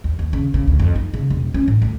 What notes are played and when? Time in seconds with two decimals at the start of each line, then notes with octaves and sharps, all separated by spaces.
0.04 D#2
0.19 D#2
0.33 C#3
0.54 C#3
0.68 D2
0.79 F2
0.96 D#4
1.14 C#3
1.30 E1
1.54 C#4
1.68 A2
1.82 D2